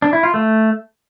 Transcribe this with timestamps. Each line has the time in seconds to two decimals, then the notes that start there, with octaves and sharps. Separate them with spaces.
0.02 D4
0.13 E4
0.23 F4
0.34 A3